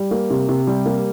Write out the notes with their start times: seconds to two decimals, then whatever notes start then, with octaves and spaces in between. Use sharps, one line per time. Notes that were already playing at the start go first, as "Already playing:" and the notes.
Already playing: G3
0.11 A#3
0.30 C3
0.49 C3
0.67 G3
0.86 A#3